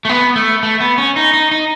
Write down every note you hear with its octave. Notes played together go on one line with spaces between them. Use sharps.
A3
B3
A3
A3
B3
C#4
D#4
D#4
D#4